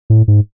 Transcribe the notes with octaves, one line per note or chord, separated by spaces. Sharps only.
A2
G#2